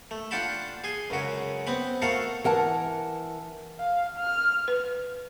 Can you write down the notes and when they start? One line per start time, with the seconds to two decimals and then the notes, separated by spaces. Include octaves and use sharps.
0.11 A3
0.31 D4 F4 F#5 G5 A5 B5
0.84 G#4 G#5 C6
1.10 C#2 F#2 C#3 F#4
1.67 B3 C4 B5
2.02 A3 F#4 A4 A#4 F5 F#5
2.44 E3 A#4 F#5 A5
3.80 F5
4.19 F6
4.68 B4